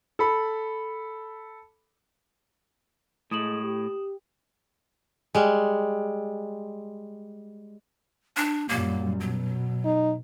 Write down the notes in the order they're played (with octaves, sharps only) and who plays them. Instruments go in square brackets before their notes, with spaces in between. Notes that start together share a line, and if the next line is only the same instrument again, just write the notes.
[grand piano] A4 B5
[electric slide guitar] A2 [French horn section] G#3 [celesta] D#6 E7 F#7
[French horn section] G4
[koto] G3 G#3
[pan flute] D4
[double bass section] F#2 A#2 G3 [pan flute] A#3
[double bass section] B2 [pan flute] F#3
[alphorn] D#4